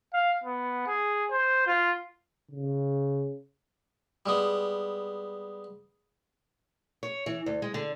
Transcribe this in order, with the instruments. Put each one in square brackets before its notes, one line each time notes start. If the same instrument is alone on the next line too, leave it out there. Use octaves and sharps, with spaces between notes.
[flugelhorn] F5
B3
G#4
C5
F4
[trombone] C#3
[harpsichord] G3 G#3 B3
[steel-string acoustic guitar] C#5
E3
D2
G#3
D3